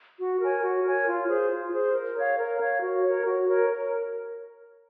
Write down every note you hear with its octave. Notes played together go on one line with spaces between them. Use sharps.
F#4
A#4 C#5 G#5
F#4
A#4 C#5 G#5
F4
G#4 C5
F4
G#4 C5
A#4
C#5 F5
A#4
C#5 F5
F#4
A#4 C#5
F#4
A#4 C#5
A#4